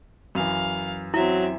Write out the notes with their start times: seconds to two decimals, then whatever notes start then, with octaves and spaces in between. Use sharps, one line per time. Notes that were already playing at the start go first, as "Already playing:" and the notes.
0.35 F#2 E3 F5
1.14 F#3 C4 E4 E5